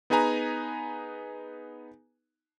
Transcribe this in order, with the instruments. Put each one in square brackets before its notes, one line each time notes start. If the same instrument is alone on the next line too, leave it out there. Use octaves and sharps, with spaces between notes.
[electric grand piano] B3 D#4 G#4 B4 G#5 A#5